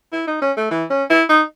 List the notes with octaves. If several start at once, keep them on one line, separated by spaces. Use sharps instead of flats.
E4
D#4
C#4
A3
E3
C#4
E4
D#4